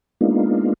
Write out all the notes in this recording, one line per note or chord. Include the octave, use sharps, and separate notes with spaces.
G#3 A#3 B3 D4 D#4 F4